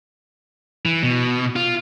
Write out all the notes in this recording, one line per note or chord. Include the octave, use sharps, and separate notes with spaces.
E3
B2
F4